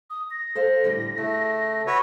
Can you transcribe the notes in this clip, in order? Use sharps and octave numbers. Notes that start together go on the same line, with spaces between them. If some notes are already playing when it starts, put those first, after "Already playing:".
D#6
A#6
A4 C5 F5
A2 D3 G3
C#3 A3
F#4 B4 C#5 E6